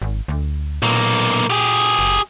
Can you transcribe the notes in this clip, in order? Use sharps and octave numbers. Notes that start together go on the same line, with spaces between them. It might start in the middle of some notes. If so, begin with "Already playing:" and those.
G#1
D2
B1 A#2 A#3
G4 G#4
F#1